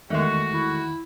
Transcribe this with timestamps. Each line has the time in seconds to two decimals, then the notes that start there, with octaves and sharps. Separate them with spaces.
0.10 E2 D#3 G#3 A3 F#4
0.53 E4